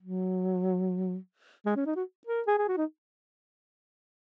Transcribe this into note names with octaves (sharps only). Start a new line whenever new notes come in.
F#3
G#3
C#4
D#4
F#4
A#4
G#4
G#4
F#4
D#4